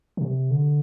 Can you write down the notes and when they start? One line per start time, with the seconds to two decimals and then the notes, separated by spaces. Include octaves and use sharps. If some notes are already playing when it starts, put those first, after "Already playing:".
0.17 D3
0.21 C3
0.51 D3